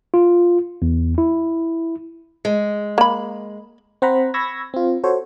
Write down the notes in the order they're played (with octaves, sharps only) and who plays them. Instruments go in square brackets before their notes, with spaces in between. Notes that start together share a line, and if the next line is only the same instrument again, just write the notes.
[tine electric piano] F4
E2
E4
[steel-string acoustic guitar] G#3
[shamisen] A#3 B5
[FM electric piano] C4 C5 F#5 A#5 B5
B5 C#6 E6 G#6 A#6
C4 F4
F#4 A4 C5 C#5